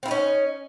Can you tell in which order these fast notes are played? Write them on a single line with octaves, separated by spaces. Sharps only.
C4 E4 D#4 C#4